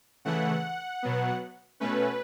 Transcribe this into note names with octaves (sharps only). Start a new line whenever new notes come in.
C#3 E3 A3 F#5
B2 F#3 B3
B2 A3 C#4 B4